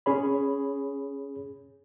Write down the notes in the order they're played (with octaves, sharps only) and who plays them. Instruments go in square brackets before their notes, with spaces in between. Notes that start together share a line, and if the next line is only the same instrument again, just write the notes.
[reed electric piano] C#4 G#4 C#5 B5